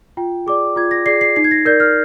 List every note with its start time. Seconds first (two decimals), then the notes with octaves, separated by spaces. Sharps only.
0.17 F4 G5
0.46 G#4 D5 D6
0.76 F4 G#6
0.91 A#6
1.06 G#4 D5 C7
1.21 C7
1.36 D#4 C7
1.44 G#6
1.51 A#6
1.65 A#4 D5 G6
1.80 F6